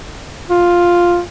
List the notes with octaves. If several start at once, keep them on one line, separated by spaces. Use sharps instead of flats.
F4